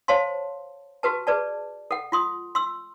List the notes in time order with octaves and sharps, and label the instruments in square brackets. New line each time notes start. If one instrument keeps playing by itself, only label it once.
[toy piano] C5 C#5 F5 A5 C6
F#4 G4 B4 A5
G#4 B4 D5 A5
A4 F#5
F4 C6 D#6
C6 E6